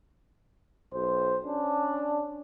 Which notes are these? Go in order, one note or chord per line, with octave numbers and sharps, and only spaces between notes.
B1 C5
C#4 D4